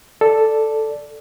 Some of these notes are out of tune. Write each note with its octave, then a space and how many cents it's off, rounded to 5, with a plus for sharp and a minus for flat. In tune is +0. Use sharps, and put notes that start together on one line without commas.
A4 +0 D5 +0